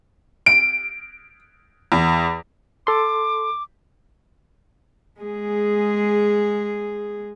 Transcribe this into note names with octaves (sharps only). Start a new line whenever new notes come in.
D7
E2
A4 C6 D6
G#3 G#4